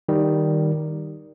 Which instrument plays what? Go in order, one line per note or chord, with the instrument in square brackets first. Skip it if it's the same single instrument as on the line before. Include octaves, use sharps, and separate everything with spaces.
[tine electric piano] D#3 G3